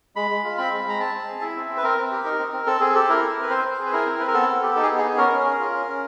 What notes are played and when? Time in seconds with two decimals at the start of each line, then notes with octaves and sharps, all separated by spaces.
0.16 G#3 B5
0.30 G#3
0.43 F4
0.57 C4 B5
0.72 G#3
0.85 G#3 A#5
0.99 C4 A5
1.14 C4
1.28 G#4
1.41 E4 E5
1.56 C4
1.70 C4
1.77 B4
1.83 C4 A#4
1.98 C4
2.11 G4
2.24 D#4 A#4
2.39 C4
2.53 C4
2.66 C4 A4
2.80 C4 G#4
2.95 G4 A4
3.09 E4 A#4
3.22 C4
3.36 C4
3.42 B4
3.50 C4 C5
3.64 C4
3.79 G#4
3.86 B4
3.92 E4 A#4
4.06 C4
4.20 C4 B4
4.28 A#4
4.34 B3 A4
4.48 B3
4.63 G4
4.76 D#4 A4
4.83 G#4
4.90 B3
4.98 G#4
5.03 B3
5.17 C#4 A#4
5.32 C#4
5.45 G#4
5.60 F4
5.73 C#4
5.87 C#4